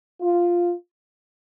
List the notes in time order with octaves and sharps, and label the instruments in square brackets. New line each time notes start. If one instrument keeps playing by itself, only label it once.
[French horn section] F4